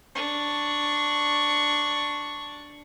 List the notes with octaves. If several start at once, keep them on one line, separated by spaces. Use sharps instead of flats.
D4 C#6